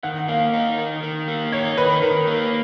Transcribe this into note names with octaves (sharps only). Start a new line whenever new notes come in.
D#3 F#5
A#3 F5
D#4
D#3
D#3
A#3
D#4 C#5
D#3 B4
D#3 A#4
A#3